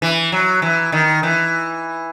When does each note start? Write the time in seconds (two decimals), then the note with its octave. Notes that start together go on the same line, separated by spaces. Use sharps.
0.02 E3
0.32 F#3
0.62 E3
0.92 D#3
1.23 E3